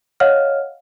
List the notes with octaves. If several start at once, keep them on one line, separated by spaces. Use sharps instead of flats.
C#5 D#5 F5 F#5 F6